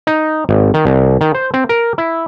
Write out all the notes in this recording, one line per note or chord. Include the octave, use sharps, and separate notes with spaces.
D#4
G#1
D#3
C2
D#3
C5
C4
A#4
E4